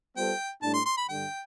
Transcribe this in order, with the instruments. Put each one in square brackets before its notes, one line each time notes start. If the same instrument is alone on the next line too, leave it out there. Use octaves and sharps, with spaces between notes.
[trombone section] G3 B3 F4 A4 C5 [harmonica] G5
[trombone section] A2 G3 D4 [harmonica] A5
[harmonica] C6
C6
B5
[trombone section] G2 D3 G3 [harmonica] G5